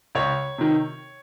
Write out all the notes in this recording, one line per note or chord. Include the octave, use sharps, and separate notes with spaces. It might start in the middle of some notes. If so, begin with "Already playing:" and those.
C#2 C#5
C3 D#3